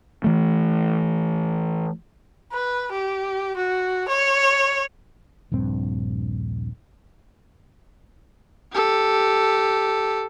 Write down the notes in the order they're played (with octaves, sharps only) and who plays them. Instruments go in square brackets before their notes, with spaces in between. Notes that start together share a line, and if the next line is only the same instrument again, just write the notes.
[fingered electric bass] E3 A3
[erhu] B4
G4
F#4
C#5
[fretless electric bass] D#1 A#1 G2 C4
[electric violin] G4 A4